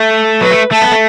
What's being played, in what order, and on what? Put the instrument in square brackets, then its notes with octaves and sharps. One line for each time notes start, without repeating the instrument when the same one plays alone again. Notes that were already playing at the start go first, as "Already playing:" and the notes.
Already playing: [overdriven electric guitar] A3
[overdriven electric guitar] F#3 [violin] B4
[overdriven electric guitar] A3
[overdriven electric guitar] A3 [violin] A4
[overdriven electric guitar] B3
A3